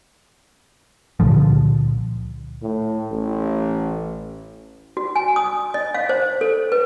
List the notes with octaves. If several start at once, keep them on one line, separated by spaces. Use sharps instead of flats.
C#2 A#2 D3 F3
A2
A1
F#4
G#5
D#6
D#5
F5
C5
A4
B4